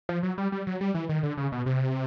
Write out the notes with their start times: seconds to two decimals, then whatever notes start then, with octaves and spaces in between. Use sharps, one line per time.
0.09 F3
0.23 F#3
0.38 G3
0.52 G3
0.67 F#3
0.81 G3
0.95 E3
1.09 D#3
1.23 D3
1.37 C#3
1.52 B2
1.66 C3